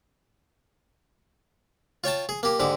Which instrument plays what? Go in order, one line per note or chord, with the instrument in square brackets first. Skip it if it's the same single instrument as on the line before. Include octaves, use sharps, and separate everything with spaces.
[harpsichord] F4 C#5 G5 A5
G#4
A#3 G4
G#2 D3 G4 D6